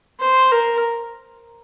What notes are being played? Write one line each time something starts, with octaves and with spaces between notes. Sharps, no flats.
C5
A#4